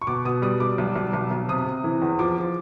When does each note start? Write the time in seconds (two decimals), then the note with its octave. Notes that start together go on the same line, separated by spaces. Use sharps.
0.02 C#6
0.07 B2 D6
0.25 B2 D#6
0.42 G3 D#6
0.60 G3 D6
0.78 B1
0.96 B1
1.13 B1
1.31 B1
1.48 C3 D#6
1.66 C3
1.84 E3
2.02 E2
2.19 F3 D6
2.37 F3